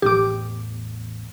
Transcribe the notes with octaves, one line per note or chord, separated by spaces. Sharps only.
A1 E2 G4 D6